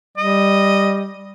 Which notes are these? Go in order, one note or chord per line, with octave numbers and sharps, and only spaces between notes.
G3 D#5